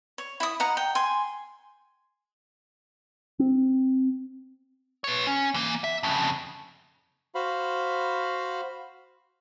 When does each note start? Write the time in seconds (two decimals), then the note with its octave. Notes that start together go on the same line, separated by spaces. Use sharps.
0.18 C#5
0.40 E4 D#6
0.60 D#5 F#5 A#5
0.77 G5
0.95 G#5 C6
3.39 C4
5.04 B4 C#5
5.27 C#4
5.54 E3 A#3
5.84 E5
6.03 F2 C#3
7.35 F#4 C5 F5 B5